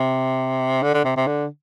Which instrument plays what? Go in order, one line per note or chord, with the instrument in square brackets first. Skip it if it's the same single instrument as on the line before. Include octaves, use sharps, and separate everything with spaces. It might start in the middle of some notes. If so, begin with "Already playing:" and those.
Already playing: [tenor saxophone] C3
D3
D3
C3
C3
D3